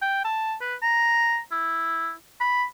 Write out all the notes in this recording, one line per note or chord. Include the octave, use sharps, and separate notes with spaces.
G5
A5
B4
A#5
E4
B5